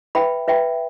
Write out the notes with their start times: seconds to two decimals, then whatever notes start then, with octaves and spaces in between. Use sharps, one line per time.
0.15 B4 E5 G5 B5
0.48 B4 E5 G5 B5